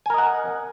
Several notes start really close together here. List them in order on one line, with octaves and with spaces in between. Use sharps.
G#5 A#4 D#5 F#5